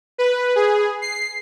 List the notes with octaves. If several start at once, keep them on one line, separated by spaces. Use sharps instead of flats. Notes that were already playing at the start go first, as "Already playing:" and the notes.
B4
G#4
C7